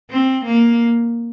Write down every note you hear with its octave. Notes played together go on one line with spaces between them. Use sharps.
C4
A#3